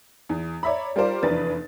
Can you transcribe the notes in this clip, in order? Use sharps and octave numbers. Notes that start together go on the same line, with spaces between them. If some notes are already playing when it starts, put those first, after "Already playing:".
E2
C#5 D5 E5 A#5 B5
G3 F4 G4 A#4 C5 D5
F1 E2 D4 B4 A6